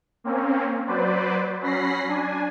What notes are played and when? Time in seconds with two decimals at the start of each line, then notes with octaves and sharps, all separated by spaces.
0.24 A#3 C4 C#4
0.86 F#3 B4 C5 D5
1.61 F#3 C#4 B5 A#6 C7
2.08 D4 G#5